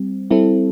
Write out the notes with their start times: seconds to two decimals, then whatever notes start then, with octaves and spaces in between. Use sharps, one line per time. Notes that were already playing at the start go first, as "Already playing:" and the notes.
Already playing: G3 C4
0.31 G3 C4 E4 A4